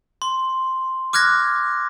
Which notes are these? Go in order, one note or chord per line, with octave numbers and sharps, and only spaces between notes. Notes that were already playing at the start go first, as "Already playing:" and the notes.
C6
D6 F6 F#6 G#6 A#6